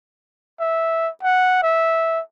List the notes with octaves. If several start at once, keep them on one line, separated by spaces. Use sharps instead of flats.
E5
F#5
E5